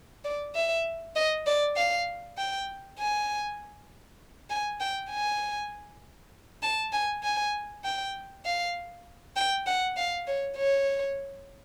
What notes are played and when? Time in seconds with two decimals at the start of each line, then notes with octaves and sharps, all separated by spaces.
0.24 D5
0.55 E5
1.16 D#5
1.46 D5
1.76 F5
2.38 G5
2.99 G#5
4.50 G#5
4.80 G5
5.10 G#5
6.62 A5
6.93 G#5
7.23 G#5
7.84 G5
8.45 F5
9.36 G5
9.66 F#5
9.97 F5
10.27 C#5
10.57 C#5